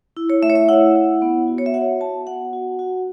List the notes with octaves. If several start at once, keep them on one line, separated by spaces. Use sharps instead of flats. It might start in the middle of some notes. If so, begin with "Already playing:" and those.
E4
C#5
A3 E5
C#5
E5
E4 F#5
E4
B3
F#4
C#5
E5
F#4 F#5
F#4 A5
B3 F#5
F#4
F#4